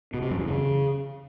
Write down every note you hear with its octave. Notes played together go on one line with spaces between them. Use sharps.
B2
C3
F#2
E2
C#3